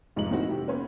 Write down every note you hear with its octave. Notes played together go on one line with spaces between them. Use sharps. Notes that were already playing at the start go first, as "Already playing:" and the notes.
F1 G#2 F3 D#5 A#5 F#7
A#2 D#3 A3 C4 E4 F#4
C3 D#3 G4
A#3 B3 C#4 B4 C5